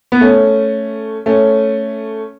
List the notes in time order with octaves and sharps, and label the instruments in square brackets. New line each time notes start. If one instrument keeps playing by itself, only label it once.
[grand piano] B3
A3 C#4
A3 C#4